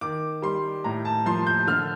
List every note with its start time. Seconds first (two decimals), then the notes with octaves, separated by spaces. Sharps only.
0.01 D#3 D6
0.42 G3 C6
0.84 A2 A#5
1.05 A5
1.26 F3 C6
1.47 G6
1.67 D3 F6